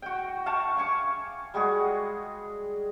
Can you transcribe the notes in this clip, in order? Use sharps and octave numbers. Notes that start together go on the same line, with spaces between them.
F#4 G5
F5 F#5 A5 C#6
F5 G#5 C#6 D6
G3 G#3 F#4 G#4